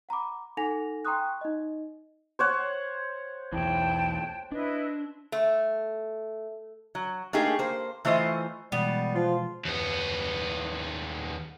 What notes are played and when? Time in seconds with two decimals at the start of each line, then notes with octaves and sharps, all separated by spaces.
0.09 F#5 A#5 B5 D6
0.57 D#4 A4 F#5 G#5 A#6 F7
1.05 G5 A#5 C6 C#6 D#6 F#6
1.41 D#4 D#5
2.39 C5 C#5 F#5
3.53 B1 E2 E3 G5 A5
4.52 D4 E4 B4 D#5
5.32 A3
6.95 F#3
7.33 A3 A#3 D#4 G4 G#4
7.59 A#3 C5
8.05 E3 A3 F4 C5 D#5
8.72 B2 E3 G3 G#3 B3
9.15 F3 F4
9.65 D#2 B3